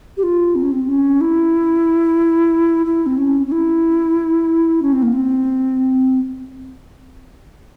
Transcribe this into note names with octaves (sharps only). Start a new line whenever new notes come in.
G4
F4
C4
C#4
C4
C#4
E4
E4
C4
C#4
C#4
E4
C#4
C4
A#3
C4